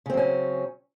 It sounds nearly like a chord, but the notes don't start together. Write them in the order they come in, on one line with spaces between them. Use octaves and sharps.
C#3 C4 F#3 C#4